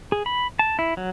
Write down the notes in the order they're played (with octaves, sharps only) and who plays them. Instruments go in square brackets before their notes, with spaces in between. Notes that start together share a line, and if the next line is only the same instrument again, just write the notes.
[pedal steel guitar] G#4
B5
A5
E4
F#3